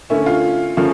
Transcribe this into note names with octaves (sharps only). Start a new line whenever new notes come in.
D3 A3 C#4 E4
F4
C#3 F3 A3 C#4 F4